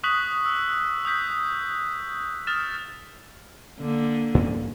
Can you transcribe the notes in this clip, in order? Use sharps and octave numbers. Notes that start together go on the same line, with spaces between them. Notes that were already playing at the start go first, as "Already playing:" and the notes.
C#6 D#6 F#6 B6 F#7
E6
D#6 F#6 G6 B6
D#6 F6 A6 E7
D3 A#3
G2 A#2 C#4